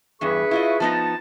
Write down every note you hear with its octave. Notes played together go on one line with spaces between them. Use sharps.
E2 G2 G#4 B4 C#6
E4 F4 D#5
F3 B3 D#4 A5